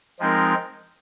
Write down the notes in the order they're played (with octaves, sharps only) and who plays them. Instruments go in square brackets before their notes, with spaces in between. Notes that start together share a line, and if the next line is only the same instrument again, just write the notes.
[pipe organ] F3 G#3 C4 D#4 A#4